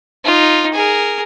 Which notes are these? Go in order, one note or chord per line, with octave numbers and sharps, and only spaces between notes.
D#4 F4
G#4 A#4